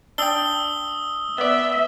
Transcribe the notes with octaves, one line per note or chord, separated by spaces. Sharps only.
D4 G5 D#6 E6 G7
B3 D5 E5